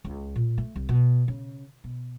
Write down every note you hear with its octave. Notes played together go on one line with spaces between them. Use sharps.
C#2
A#2
A3
C2
B2
C#3
B2